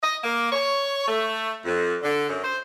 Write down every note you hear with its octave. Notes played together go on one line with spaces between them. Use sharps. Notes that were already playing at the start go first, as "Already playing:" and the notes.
D#5
A#3
C#5
A3
F2
D3
F#2
C5